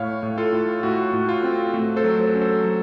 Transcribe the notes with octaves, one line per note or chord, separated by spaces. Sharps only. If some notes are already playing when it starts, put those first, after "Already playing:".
Already playing: A2 C#5 F5
A2
F4 A4
A2
A2 F#4
A2
F4
C4
A3 F#4
A4 C5
F#3
A4 C5
C#4
A4 C5
F#3